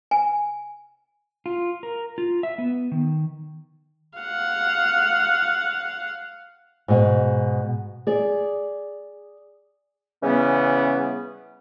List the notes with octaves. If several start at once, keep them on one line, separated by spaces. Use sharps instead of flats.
G#5
F4
A#4
F4
E5
B3
D#3
F5 F#5
G#2 B2
G#4 D5
C#3 E3 G3 B3 C#4